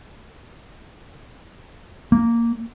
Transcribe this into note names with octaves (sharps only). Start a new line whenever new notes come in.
A#3